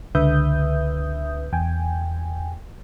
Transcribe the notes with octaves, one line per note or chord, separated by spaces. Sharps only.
C#2 D3 B4 E5 D#6 G6
E2 G5 G#5